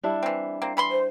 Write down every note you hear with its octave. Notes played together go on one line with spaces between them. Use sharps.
G3 D4 E4
E3 C4
A#3 C4
E3 B5 C6
C5